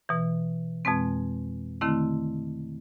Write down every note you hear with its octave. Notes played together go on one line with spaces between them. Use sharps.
B2 E3
F2 B2 G#3 C4
D3 D#3 A3 C4 E4